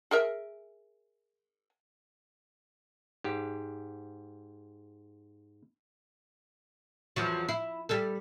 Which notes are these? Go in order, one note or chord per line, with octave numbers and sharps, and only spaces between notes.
G#4 A#4 E5
G#2 G4
E2 F3 F#3
E4
G3 A4